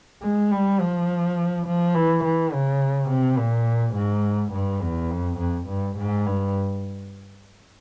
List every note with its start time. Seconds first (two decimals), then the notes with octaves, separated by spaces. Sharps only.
0.23 G#3
0.51 G3
0.80 F3
1.66 F3
1.95 E3
2.24 E3
2.53 C#3
3.10 C3
3.38 A#2
3.95 G#2
4.53 G2
4.82 E2
5.11 F2
5.39 F2
5.68 G2
5.97 G#2
6.26 G2